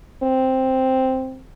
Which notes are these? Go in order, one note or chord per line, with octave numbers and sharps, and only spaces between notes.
C4